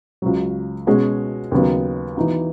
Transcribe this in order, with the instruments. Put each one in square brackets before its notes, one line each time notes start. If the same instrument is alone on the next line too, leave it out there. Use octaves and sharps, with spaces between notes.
[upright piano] C#2 C#3 F#3
B2 G#3 C#4 F#4
D#2 C#3 F#3 B3 D#4
E3 B3 D#4 F#4